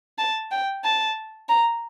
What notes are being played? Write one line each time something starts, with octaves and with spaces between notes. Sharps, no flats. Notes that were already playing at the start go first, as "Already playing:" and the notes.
A5
G5
A5
A#5